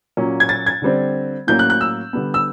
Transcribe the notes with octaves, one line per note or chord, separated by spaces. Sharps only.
A#2 F#3 A#3 C#4
G#6
A6
G#6
D3 G3 C4
A2 F#3 A#3 C#4 G6
F#6
F#6
E6
D3 G3 B3
E6